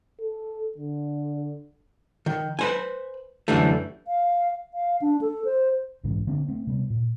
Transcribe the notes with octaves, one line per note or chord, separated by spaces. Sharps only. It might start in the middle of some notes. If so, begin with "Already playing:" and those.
A4
D3
D#3
B4 C5 G#5
F#2 D3 E3 G3 A3
F5
F5
D4
A4
C5
B1 G#2 C#3 E3
D3 A#3 C4 D4
A3 C4
C3 G3 B3
A#2